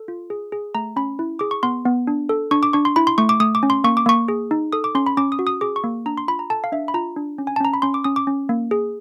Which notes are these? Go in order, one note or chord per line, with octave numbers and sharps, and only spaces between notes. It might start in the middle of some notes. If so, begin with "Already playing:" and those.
Already playing: A4
F4
G#4
G#4
A3 A#5
C#4 B5
E4
G#4 D6
C#6
B3 C6
B3
D4
A4
D4 C#6
D6
D4 C#6
C6
E4 B5
C6
A3 C#6
D6
A3 D#6
D6
C#4
C6
A#3 C#6
D6
A#3 C#6
G#4
D#4
A4 D#6
D6
C#4 C6
B5
C#4 D6
D#6
F#4
D#6
G#4 D6
C#6
A#3
D4 A#5
C6
F4 B5
A#5
A4 A5
F5
D4 E5
B5
F4 A#5
D4
C#4
G#5
A5
C#4 A#5
B5
C#4 C6
D6
C#4 D#6
D6
C#4
A#3
G#4